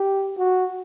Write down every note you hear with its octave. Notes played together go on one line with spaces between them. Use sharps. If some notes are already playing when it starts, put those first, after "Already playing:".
Already playing: G4
F#4